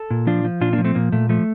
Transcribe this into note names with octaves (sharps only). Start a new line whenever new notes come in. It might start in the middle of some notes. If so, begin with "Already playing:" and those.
Already playing: A4
A#2
F3 D4 F4
F3
A#2 D4 F4
A#3 D4
F3
A3 C4
A#2 A#3
A#2 A3
F3 A3